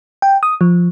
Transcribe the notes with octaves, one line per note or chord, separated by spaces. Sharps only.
G5
D#6
F3